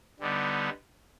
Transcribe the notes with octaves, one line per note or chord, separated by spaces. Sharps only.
D3 G3 B3 D#4